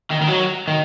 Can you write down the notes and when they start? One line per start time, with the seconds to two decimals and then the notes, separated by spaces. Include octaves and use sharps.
0.11 D#3
0.21 D#3
0.27 F#3
0.68 D#3